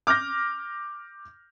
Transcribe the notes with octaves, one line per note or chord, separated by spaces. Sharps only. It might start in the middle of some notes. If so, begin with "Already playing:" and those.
D6 F6 G6 A#6